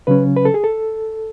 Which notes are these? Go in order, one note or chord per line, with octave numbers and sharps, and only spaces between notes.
C#3 F#3 C#4 B4
B4
A4
G#4
A4